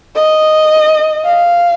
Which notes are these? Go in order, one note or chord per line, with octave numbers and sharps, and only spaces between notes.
D#5
F5